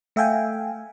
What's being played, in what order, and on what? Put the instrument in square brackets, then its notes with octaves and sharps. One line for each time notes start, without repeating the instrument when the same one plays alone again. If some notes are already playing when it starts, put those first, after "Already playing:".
[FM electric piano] A3 E5 F5 G5 G#5